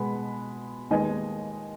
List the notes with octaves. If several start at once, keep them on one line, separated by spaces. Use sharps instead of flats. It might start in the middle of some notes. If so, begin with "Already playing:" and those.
Already playing: B2 G#3 B3 F#5 B5
D#2 D#3 G#3 B3 D#5 G#5